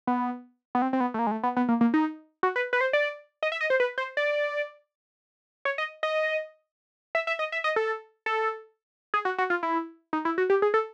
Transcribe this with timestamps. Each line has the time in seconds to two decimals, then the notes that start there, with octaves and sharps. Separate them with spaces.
0.07 B3
0.75 B3
0.82 C4
0.93 C4
1.00 B3
1.14 A3
1.19 A#3
1.27 G#3
1.31 A3
1.43 B3
1.57 B3
1.69 A#3
1.81 A#3
1.94 D#4
2.43 F#4
2.56 B4
2.73 B4
2.81 C5
2.93 D5
3.43 D#5
3.52 E5
3.61 D#5
3.70 C5
3.80 B4
3.98 C5
4.17 D5
5.65 C#5
5.78 D#5
6.03 D#5
7.15 E5
7.27 E5
7.39 D#5
7.52 E5
7.64 D#5
7.76 A4
8.26 A4
9.14 G#4
9.25 F#4
9.38 F#4
9.50 F4
9.63 E4
10.13 D#4
10.25 E4
10.38 F#4
10.50 G4
10.62 G#4
10.74 A4